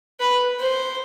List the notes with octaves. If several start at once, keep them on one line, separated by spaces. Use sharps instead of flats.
B4
C5